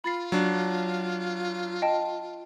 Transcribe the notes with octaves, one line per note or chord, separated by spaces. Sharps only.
F4 B5 A6 C7
F#3 D4
D#5 G5 A5